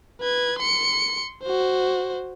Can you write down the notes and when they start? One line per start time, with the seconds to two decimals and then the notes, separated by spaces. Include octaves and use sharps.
0.21 B4 G#6
0.59 C6 C#7
1.43 F#4 C5